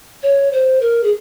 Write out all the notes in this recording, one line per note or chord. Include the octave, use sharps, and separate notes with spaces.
C#5
C5
A#4
G#4